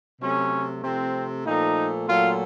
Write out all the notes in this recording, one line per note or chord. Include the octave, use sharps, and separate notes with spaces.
C3 F#3 A3 C#4
C3 F3 A3 C4
A#2 F3 A3 D#4
A#2 F#3 A3 F4